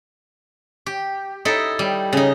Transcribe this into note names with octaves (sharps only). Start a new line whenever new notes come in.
G4
D#4 E4 A4
G3
C#3 D#4